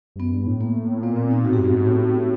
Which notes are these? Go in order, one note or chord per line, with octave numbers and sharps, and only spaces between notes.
G2
F#2 B3
G2
A2
A#3
A#2 B3
C4
D#4
A2 F#4
G4
G2 F#4
G#2
A2